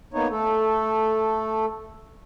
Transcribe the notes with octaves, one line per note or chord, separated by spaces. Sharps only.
A#3 B3 D#4 C#5
A3 A4